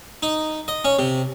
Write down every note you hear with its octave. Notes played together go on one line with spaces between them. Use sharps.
D#4
D#5
C#4
C3